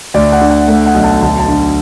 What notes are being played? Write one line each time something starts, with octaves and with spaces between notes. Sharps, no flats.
D2 D5
F#5
D3
F#5
A3 F#5
F#5
B1
A5
D2 A5
A5
D3